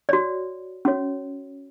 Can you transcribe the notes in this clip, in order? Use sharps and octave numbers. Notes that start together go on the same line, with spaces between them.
F#4 C#5 D5
C#4 F#4 C#5